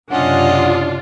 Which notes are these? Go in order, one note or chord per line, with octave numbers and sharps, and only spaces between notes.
F#1 C3 C#4 D4 F4 D#5 F#5